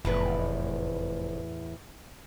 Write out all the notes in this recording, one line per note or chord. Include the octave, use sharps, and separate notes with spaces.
F1 E2 A2 B4